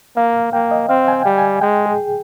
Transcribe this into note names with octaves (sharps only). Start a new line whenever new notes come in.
A#3 F5
A#3 G5
D#5
C4 F5
G#5
G5
G3
G#5
G#3 G5
G#4